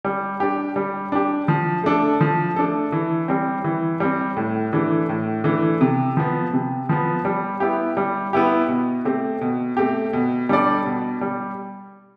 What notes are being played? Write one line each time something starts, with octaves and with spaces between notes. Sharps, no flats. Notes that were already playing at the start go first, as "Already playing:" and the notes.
G3
D4 G4
G3
D4 G4
F3
A3 D4 A4
F3
A3 D4 A4
E3
G3 C4
E3
G3 C4
A2
E3 A3 D4
A2
E3 A3 D4
C3
F3 B3
C3
F3 B3
G3
B3 E4 G4
G3
B3 E4 G4
B2
A3 C4 G4
B2
A3 C4 G4
B2
G3 D4 A4 D5
B2
G3